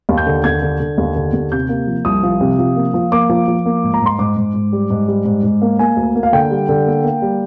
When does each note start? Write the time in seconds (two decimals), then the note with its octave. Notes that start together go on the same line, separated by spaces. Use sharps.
0.09 D#2
0.18 G6
0.27 D3
0.44 D#2 G#6
0.62 D3
0.80 D3
0.98 D#2
1.16 D3
1.33 D#2
1.52 C3 G6
1.69 A#3
1.87 F3
2.05 C2 D#6
2.23 F3
2.41 C3
2.59 F3
2.76 A#3
2.94 F3
3.12 A#3 D6
3.29 F3
3.48 F3
3.66 A#3
3.83 G#2
3.94 A#5
4.01 G#2 C6
4.19 G#2 D6
4.37 G#2
4.54 G#2
4.73 G3
4.90 G#2
5.08 G3
5.25 G#2
5.43 G#2
5.62 A#3
5.79 A#3 G#5
5.97 D2
6.16 A#3
6.23 F5
6.33 D3 G5
6.51 G3
6.69 D3
6.86 A#3
7.04 A#3
7.22 G3